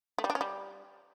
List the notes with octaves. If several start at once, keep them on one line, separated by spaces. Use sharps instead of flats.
A3
G3
D4
C#4
G3